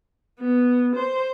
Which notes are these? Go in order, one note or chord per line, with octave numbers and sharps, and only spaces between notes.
B3
C5